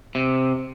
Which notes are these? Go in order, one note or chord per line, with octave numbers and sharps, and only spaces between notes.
C3